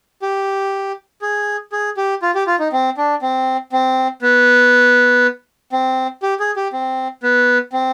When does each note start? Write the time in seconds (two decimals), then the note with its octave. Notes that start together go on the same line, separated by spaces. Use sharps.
0.22 G4
1.22 G#4
1.72 G#4
1.97 G4
2.22 F4
2.35 G4
2.47 F4
2.59 D#4
2.72 C4
2.97 D4
3.22 C4
3.72 C4
4.22 B3
5.72 C4
6.23 G4
6.40 G#4
6.56 G4
6.73 C4
7.23 B3
7.73 C4